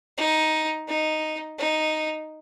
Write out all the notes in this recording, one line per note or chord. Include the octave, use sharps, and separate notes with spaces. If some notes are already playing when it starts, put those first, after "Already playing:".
D#4
D#4
D#4